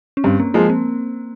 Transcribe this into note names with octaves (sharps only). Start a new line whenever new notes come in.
C#4
G2 C4
A#3
F3 G#3 A#3
C4